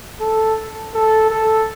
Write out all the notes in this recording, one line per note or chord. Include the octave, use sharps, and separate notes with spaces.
A4
A4
A4